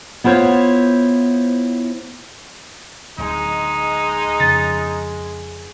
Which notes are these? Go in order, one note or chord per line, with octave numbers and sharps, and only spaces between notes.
B3 E4 F4 C5 C#5
D1 G#3 D#4
F2 C#3 A6